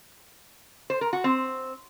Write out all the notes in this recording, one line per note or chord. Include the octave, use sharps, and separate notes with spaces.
C5
A#4
F#4
C4